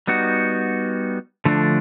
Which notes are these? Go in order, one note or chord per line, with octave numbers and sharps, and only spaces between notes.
G3 B3 D#4 F#4
D3 F3 A3 D4